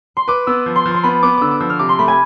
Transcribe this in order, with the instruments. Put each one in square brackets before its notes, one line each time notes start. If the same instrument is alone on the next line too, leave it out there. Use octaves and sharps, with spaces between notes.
[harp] C6
[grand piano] B4 [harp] D6
[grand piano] B3 [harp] E6
[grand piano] F3
[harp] C6
[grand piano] F3
[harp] C6
[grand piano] B3 [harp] B5
[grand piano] B3 [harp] D6
[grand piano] D3 [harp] D6 E6
[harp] D6
[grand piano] F3 [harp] E6
[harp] F6
[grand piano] C3 [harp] D6
[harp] C6
[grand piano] A3 [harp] B5
[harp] G#5